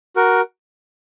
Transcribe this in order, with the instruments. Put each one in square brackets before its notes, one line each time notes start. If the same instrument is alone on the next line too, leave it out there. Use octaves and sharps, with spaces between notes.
[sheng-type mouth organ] F#4 A#4